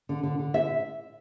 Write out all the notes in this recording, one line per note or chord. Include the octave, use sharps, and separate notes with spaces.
D3
D3
D3
E5